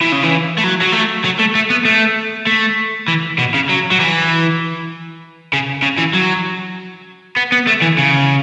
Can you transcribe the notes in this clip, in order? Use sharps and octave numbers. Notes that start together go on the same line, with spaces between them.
E3
C#3
E3
A3
F#3
F#3
A3
F#3
A3
A3
B3
A3
A3
E3
B2
C#3
F#3
F#3
E3
C#3
C#3
E3
F#3
B3
B3
A3
E3
C#3